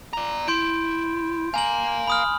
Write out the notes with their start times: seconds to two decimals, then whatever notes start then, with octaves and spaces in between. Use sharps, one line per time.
0.13 D5 A#5
0.48 E4 C6 G6 D7
1.54 F5 G#5 A#5 F#7
2.08 B5 D#6 F6